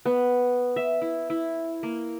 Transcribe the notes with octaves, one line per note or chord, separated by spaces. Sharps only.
B3
E5
E4
E4
A#3